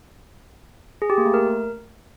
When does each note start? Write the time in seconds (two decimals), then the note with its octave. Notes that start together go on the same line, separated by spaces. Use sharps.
1.02 G#4
1.10 G4
1.18 A#3
1.26 A3
1.34 A#4